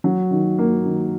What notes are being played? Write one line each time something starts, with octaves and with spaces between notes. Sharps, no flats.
F#3
D#3
A#3
D#3